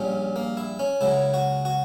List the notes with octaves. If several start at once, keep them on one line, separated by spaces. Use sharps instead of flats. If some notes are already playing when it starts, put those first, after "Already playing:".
Already playing: A#1 A#2 G3 C#4
A#3
E4
C#4
C#2 C#3 F#3 E4
F#4
F#4